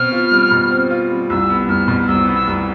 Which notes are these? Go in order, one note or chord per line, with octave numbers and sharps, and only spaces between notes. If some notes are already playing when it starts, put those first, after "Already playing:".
Already playing: B2 C4 F6
F4
G3
B2
C4
F4
G3
C2 E6
B3
C2 F6
B2
C2 E6
B3
E6
C2